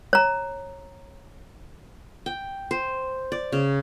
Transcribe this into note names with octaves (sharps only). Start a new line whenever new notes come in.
C#5 A#5
G5
C5
D5
C#3